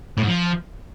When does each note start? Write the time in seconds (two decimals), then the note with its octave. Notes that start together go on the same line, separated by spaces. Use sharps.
0.18 A2
0.23 G#2
0.28 F3